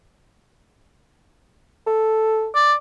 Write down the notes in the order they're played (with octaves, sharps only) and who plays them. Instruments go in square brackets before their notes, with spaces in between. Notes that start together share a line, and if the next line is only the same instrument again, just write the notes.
[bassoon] A4
[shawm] D5